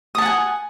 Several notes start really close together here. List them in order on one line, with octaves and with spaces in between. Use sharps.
D#6 A5 F#5 G#5